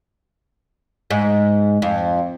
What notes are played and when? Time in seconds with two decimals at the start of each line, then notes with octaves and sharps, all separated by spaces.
1.10 G#2
1.82 F2